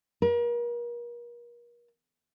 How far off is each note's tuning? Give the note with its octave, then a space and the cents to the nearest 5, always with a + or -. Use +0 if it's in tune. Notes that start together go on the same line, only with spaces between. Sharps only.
A#4 +40